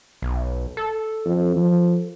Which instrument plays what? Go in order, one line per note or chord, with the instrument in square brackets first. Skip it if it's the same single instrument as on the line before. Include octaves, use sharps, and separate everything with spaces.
[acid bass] B1
A4
[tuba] F2
F3